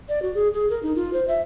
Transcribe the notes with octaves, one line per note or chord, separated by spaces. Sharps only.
D5
F#4
G#4
G#4
A#4
D#4
F4
C5
E5